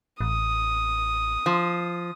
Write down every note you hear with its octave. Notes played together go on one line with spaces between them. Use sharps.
A1 D#6
F3